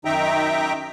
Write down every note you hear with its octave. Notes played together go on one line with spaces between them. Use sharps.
F#2 D#3 D#4 E5 G5 A#5